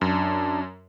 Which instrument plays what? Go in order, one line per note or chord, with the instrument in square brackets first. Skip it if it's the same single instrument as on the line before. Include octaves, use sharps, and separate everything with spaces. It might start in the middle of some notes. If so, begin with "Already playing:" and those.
[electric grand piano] F#2 [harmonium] D4